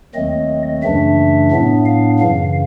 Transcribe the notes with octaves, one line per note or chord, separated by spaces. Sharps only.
D#2 D#3 F#3 A3 C4 D#5
F#2 C#3 E3 A3 D4 E5
A2 F#3 B3 D4
F5
F#2 C#3 E3 F5